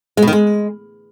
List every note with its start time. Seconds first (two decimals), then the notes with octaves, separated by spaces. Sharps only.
0.17 G#3
0.22 B2
0.27 D#3
0.33 G#3